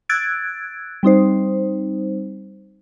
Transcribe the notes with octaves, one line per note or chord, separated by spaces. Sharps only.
E6 F#6 G#6 A6 D7
G3 C4 D#4 C5